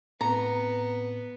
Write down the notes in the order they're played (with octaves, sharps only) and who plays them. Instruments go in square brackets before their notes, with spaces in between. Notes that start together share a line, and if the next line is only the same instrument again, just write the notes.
[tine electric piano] A2 C4 C#7 [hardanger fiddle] B3 [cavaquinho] A#5